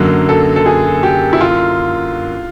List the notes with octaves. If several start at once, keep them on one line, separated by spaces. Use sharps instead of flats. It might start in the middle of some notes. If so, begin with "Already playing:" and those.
Already playing: F#2 D3 F#3 A#3
A4
A4
G#4
G4
E4
F4